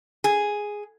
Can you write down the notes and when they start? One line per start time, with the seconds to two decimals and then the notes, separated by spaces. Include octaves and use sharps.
0.24 G#4